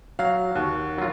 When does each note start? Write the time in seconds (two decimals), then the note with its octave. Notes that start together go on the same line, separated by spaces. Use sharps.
0.19 F#3 F5
0.55 D#2 F#5
0.98 F#3 F4